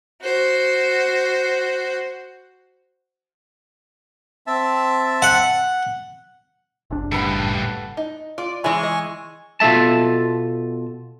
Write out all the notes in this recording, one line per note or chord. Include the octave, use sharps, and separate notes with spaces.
F#4 C5
C4 E5 A5
F#5
F#1 C2 D4
A2 C#3 G3 A4 B4 F#5
D#4
F4 D5
E3 G#3 G#4 C#5 E5 G#5 C#6
D#5
B2 F4 A4 E5 A5